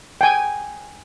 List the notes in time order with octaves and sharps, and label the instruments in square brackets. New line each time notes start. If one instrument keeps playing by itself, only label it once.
[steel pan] G5 G#5